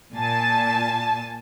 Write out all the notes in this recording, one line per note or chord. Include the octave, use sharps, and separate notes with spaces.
A#2 G#5 A5